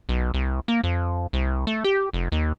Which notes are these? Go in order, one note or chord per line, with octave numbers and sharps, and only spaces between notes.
B1
C2
A#3
F2
C2
A3
G4
F1
D#2